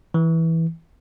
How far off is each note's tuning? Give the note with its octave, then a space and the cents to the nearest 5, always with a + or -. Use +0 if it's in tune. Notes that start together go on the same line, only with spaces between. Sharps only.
E3 -10